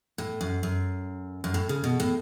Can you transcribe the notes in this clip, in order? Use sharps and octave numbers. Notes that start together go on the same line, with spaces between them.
A2
F#2
F#2
F#2
A2
C#3
B2
A2